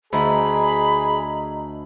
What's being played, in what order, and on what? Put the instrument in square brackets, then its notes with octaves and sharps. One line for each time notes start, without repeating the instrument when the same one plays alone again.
[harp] D2 [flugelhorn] G#4 [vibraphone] D#5 A#5 [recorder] B5